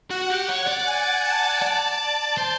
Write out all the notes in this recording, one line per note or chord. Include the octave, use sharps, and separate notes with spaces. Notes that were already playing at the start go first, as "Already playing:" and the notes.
F#4 F#5
G4
C#5
D5
G#5
A5
D5 A5
C5